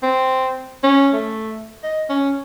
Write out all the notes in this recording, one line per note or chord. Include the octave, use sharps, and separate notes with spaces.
C4
C#4
A3
D#5
C#4